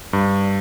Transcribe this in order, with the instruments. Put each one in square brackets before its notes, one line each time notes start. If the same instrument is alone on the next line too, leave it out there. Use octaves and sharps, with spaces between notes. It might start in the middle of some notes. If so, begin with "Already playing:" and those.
[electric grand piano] G2